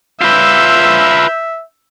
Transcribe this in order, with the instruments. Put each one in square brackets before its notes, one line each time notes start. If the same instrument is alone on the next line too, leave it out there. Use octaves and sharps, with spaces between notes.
[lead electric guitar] F4 B4 [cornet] E5 [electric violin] E6 G6